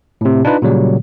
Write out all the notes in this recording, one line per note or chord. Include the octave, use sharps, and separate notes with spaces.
A2 C3
D4 D#4 F4 B4
A#2 C#3 F#3 G3